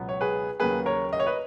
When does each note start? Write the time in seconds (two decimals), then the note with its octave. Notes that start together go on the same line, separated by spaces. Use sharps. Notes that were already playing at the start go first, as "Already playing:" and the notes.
Already playing: C#2 B2 F#3 B3
0.09 C#5
0.21 G#4 B4
0.60 D#2 C#3 F#3 A#3 G#4 B4
0.86 A#4 C#5
1.13 D#5
1.20 C#5
1.27 B4 D#5